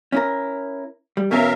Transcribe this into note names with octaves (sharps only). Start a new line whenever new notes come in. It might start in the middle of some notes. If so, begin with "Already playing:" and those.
C#4 E4 A#4
G3
B2 E3 C#4 A#4 E5 F5